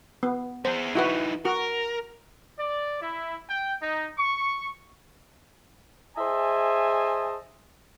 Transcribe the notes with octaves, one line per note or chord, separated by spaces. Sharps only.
B3
B3 G#4 C5
E3 D#4 E4 F#4 B4
F#4 A#4
D5
E4
G5
D#4
C#6
G#4 C5 D#5 E5 G#5 A5